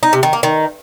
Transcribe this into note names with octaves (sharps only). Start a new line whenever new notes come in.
D#4
C3
D#3
A#3
D#3